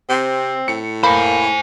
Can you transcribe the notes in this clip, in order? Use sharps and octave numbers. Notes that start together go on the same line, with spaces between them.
C3 C4
A2 C#7
A#3 C5 G#5 B5